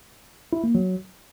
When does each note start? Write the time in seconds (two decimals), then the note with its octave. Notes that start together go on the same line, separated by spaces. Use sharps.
0.53 E4
0.64 A#3
0.75 F#3